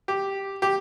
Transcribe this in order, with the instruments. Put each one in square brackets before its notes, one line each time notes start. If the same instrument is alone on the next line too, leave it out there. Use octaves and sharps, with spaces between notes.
[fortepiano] G4
G4